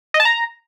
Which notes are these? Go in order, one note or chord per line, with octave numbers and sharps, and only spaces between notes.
D#5
A5
A#5